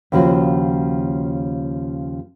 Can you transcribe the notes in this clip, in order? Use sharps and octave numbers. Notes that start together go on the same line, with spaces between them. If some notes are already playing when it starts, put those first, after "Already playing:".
D#2 C#3 F3 F#4